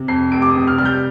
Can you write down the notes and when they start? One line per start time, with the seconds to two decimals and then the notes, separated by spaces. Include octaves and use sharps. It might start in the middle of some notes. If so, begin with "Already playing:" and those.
Already playing: C3
0.08 F2 C7
0.31 F1 D7
0.42 D6
0.50 D#6
0.56 C3
0.68 F6
0.78 G3 F6
0.85 G6